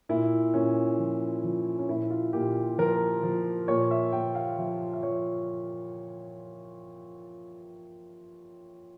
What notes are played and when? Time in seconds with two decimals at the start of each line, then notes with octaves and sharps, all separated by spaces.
0.09 A#2 E4
0.54 A#2 C#4
0.99 F3
1.44 F3
1.79 C#4
1.88 A#2 E4
2.10 F4
2.33 A#2 G4
2.78 F3 A#4
3.23 F3
3.68 A#2 C#5
3.91 E5
4.13 A#2 G5
4.35 F5
4.58 F3 E5
4.93 E5
5.03 F3 C#5